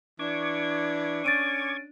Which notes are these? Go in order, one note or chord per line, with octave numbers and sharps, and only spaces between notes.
E3 D4 C#6 D6 G#6
C#4 A6 D7 D#7